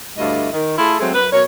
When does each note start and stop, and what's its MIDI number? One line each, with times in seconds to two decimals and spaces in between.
0.17 0.48 38
0.17 0.48 43
0.17 0.48 57
0.17 0.48 64
0.17 0.48 75
0.17 0.48 77
0.52 0.75 51
0.77 0.98 57
0.77 0.98 64
0.77 0.98 65
0.77 0.98 68
0.77 0.98 69
1.00 1.11 54
1.00 1.11 56
1.00 1.11 57
1.00 1.11 60
1.14 1.27 42
1.14 1.27 71
1.32 1.43 47
1.32 1.43 54
1.32 1.43 70
1.32 1.43 73